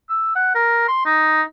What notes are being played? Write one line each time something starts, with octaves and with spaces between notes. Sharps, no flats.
E6
F#5
A#4
C6
D#4